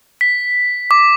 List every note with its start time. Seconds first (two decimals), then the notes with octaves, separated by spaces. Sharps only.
0.21 B6
0.91 D6